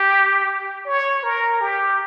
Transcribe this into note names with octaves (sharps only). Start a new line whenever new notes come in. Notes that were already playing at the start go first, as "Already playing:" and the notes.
Already playing: G4
C#5
A#4
G4